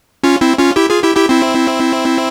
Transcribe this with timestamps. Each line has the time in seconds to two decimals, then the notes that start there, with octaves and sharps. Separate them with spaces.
0.24 C#4 F4
0.41 C4 E4
0.58 C#4 F4
0.76 E4 G4
0.90 F4 G#4
1.03 E4 G4
1.16 E4 G4
1.29 C4 E4